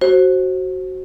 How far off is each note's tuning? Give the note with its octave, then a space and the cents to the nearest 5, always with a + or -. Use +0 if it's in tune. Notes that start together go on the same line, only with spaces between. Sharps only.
F#4 +10 C5 +20